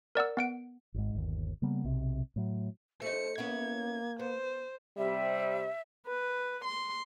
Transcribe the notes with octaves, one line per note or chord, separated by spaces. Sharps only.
A#4 D5 F#5 E6
B3 F#5 D7
G#1 G#2
G1 D#2
C#3 G3 A#3 B3
B1 C3
A2 F#3
A3 D#4 C5 C#7
A#3 B3 C#4 E4 G#6
B3 C5
C3 G3 E5
B4
C6